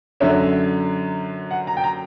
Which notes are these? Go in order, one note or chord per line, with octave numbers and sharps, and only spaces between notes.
F#2 D3 F#3 C#4 E5
F#5
A#5
G5
A#5